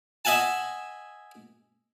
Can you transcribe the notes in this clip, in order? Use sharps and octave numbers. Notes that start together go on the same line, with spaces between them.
D#5 E5 F#5 G#5 A5